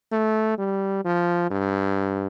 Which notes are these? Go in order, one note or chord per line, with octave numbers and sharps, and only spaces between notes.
A3
G3
F3
G2